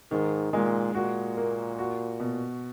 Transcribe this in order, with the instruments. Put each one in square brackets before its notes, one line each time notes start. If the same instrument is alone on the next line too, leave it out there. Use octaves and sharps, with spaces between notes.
[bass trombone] G#2 [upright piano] D#3
[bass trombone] A#2 [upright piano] G#3
[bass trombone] A#2 [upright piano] F#4
[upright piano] A#3
F#4
B2